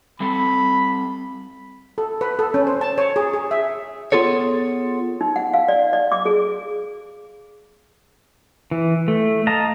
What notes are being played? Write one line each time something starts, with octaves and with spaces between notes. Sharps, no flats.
G3 C4 A4 B5
A4
B4
A4
C#4
C5
A5
C#5
G#4
G#4
E5
B3 F4 G#4 A4 C#5
D#4
F#5
F5
D5
D5
D6
G#4
E3
A3
D#5 F5 A5 A#5